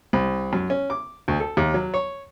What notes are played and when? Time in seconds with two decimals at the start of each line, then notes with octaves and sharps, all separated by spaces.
0.13 C2
0.53 F#2
0.70 C#4
0.90 D6
1.28 D2
1.40 A4
1.57 D#2
1.74 F#3
1.94 C#5